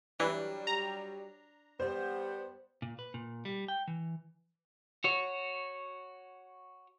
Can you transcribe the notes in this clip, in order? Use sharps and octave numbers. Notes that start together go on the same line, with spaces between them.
E3 F#3 G3 D4
A#5
G3 B3 C5
A#2
B4
A#2
G3
G5
E3
F#4 C#5